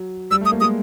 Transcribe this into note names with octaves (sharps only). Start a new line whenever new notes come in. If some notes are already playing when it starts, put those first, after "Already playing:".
Already playing: F#3
G3 E6
A3
D#6
A#3
G#3 D#6